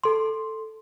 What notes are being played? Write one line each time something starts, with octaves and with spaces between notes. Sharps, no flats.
A4 C6